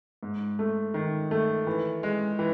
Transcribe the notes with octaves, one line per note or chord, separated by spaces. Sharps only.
G#2
A3
D#3
A3
E3
G#3
E3